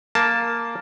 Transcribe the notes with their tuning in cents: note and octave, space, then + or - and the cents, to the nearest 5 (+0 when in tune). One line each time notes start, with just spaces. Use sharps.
A#3 +0 A5 +0